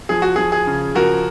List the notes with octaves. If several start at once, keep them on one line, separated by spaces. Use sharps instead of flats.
F3 G#4
F#4
F3 G#4
G#4
C#3
F3 F#4 A#4